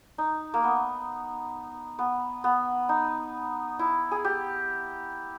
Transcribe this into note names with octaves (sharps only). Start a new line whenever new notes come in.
D#4
A#3
B3
B3
B3
D#4
E4
G#4
G4